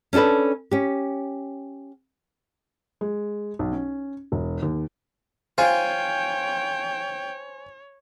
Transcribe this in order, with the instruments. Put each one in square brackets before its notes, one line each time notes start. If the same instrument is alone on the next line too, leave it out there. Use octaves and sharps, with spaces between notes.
[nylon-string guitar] C#4 D4 F#4 A4 B4
C#4 G4
[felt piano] G#3
B1
C#4
E1
D#2
[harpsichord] F4 [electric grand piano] C5 G#5 [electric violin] C#5 [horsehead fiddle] G5